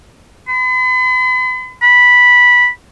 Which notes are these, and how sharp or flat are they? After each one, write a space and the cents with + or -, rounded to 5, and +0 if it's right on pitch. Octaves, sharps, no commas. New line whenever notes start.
B5 +45
B5 -10